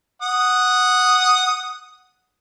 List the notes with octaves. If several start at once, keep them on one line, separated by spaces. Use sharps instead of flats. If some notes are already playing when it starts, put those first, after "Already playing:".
F#5 D#6